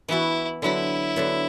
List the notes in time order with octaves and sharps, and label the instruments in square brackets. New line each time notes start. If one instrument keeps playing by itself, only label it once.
[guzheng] E3 B3 F#4 [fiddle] E4
[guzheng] D3 F#3 B3 [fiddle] E4
[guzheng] D3 F#3 B3